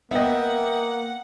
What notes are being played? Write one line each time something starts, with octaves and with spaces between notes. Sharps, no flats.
A#3 B3 D#5 E5 F#5 G5